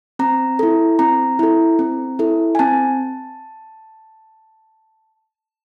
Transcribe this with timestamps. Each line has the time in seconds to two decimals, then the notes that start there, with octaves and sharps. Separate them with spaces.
0.19 C4 A#5
0.59 E4 A4
0.99 C4 A#5
1.39 E4 A4
1.79 C4
2.19 E4 A4
2.55 G#5
2.59 C4 A5